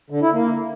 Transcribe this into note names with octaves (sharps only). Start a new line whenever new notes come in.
D3
E4
A#3